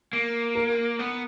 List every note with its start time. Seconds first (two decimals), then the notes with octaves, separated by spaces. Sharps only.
0.13 A#3
0.55 A#4
0.99 B3